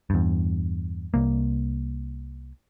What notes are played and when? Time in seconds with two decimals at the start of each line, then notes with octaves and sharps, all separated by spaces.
0.10 E2 G2
1.14 C2 A#3